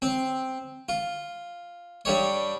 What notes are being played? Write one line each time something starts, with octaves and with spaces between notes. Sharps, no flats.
C4
F4
G2 G3 C#5